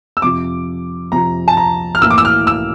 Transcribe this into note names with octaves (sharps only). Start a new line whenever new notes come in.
E6
F2 C3 F3 D6
F2 C3 F3 A#5
A5
A#5
F6
A2 E3 A#3 E6
D6
E6
F6
E6